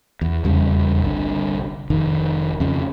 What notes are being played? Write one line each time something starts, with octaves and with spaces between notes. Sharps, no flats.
E2
F1 E2 C#3 G3
G1 C2 G2 D3
F1 D#3
F2 C#3